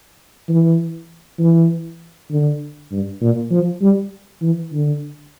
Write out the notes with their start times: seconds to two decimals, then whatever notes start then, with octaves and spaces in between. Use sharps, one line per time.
0.48 E3
1.39 E3
2.31 D3
2.92 G2
3.21 A#2
3.51 F3
3.81 G3
4.42 E3
4.73 D3